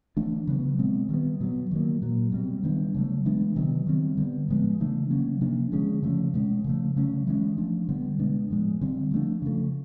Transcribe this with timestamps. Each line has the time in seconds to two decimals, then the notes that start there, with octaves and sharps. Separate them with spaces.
0.17 E3 A3 D4
0.47 C#3 F#3 B3
0.78 B2 G#3 C4
1.09 D#3 G3 B3
1.40 B2 F#3 B3
1.71 D#3 F#3 A#3
2.02 A#2 F#3 A#3
2.32 B2 G3 C4
2.63 D#3 G3 B3 D4
2.95 C#3 F#3 A3
3.25 E3 G#3 B3 D4
3.56 C3 D#3 F#3 B3
3.87 D#3 G3 C4
4.17 D3 G3 B3
4.49 A2 F3 G#3 B3
4.80 C#3 E3 A3 D4
5.10 C#3 F#3 A#3 C#4
5.41 C3 F3 A#3 D4
5.72 D3 F3 G#3 C#4
6.02 C#3 F3 A3 C#4
6.34 B2 G#3 C#4
6.64 C#3 F3 A3
6.96 C#3 F#3 A3 C#4
7.27 E3 G#3 C#4
7.57 F3 A3 D4
7.89 D3 G3 B3
8.19 B2 G#3 B3 D4
8.50 A2 F3 G#3
8.81 D3 G3 C4
9.11 F3 A3 D4
9.42 C#3 F3 A3